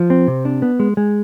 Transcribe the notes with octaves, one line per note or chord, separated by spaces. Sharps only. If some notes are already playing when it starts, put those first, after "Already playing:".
Already playing: F3
C4
C3
D4
B3
G#3
G#3